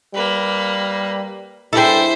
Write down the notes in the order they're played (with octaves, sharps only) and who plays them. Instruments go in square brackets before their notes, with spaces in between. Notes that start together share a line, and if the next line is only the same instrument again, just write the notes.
[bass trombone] G3 [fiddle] A#3 B4
[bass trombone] G2 [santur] E4 G#4 [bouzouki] A4 G5 [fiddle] C5 E5